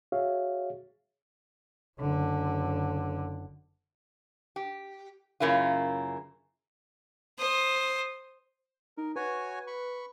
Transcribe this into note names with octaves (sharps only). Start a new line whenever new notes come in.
F#4 G#4 C#5 E5 F5
F#1 D3
G4
F#2 C#3 A#3 E4 F4
C5 D#6
D#4 A#4
F#4 B4 C#5 G#5
B5 C#6